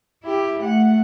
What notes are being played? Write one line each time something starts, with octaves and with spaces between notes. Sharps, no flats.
E4 G4
A3 F#5